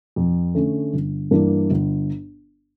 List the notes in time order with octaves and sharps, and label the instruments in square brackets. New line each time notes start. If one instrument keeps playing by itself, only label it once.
[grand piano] F2
D3 A3 C#4
G1
G2 E3 A#3 D4
G1